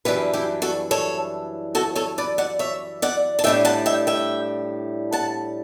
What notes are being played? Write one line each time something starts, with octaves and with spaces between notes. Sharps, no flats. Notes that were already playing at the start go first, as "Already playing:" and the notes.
F#2 E3 G3 D4 G4 B4
E4 G4
F#4 A4
A4 C#5
F#4 A4
A4 C#5
B4 D5
D5 F#5
C#5 E5
D5 F#5
A5
A2 G3 D4 E5 G5
F#5 A5
E5 G5
E5 G5
F#5 A5